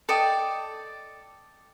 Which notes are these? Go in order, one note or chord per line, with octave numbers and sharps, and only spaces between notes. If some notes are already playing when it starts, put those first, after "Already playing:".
A4 D5 D#5 G5